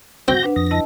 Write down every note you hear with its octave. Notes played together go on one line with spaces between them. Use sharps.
C4 F#4 G6 A#6
D4 B4 F#5
F2 D#6 A#6
E4 D#5 A5